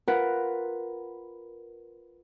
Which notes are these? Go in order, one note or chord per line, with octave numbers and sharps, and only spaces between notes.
F4 A#4 B4 F#5